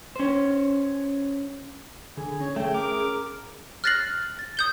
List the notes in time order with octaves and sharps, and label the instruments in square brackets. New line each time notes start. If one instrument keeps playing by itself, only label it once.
[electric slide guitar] C#4 C5
[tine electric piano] D3 [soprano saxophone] G#4
[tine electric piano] C#4 [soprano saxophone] C#5
[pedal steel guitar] A3 [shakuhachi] G#4 [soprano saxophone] G5
[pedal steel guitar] A#4 [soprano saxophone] D6
[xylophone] F6 F#6 A6 A#6 C7 F#7
A6
D#6 G6 G7